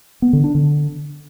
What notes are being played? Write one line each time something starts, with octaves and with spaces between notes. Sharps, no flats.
B3
D3
D4
D3